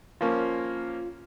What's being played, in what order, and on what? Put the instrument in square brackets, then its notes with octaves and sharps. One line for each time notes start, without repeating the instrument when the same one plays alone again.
[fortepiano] F3 A#3 C#4 [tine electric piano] F4